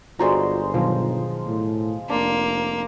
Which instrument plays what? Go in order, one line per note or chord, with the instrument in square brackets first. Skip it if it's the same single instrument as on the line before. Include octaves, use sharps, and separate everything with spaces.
[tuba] G1 [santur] G#3 C5 A#5 [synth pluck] F4 F#4 D5
[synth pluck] B2 D#3 F#3 [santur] F3
[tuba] A2
[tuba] F1 [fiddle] A#3 [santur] D4 C6